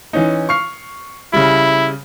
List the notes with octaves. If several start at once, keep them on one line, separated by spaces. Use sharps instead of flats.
E3 C#4 D#4
C#6 F6 C7
C#3 G3 E4